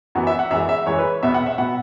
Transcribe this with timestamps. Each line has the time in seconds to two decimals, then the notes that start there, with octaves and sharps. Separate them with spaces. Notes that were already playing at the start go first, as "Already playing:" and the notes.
0.15 F#2 E3 B3 F#4
0.27 E5
0.39 F#5
0.51 F#2 E3 G#3 E5
0.69 E5
0.86 F#2 E3 G#3 C#5
0.99 B4
1.23 E2 B2 B3 E5
1.34 F#5
1.46 E5
1.58 B2 B3 F#5